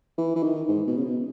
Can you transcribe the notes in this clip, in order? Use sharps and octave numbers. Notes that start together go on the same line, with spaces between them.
E3
E3
D#3
G#2
B2
C#3
B2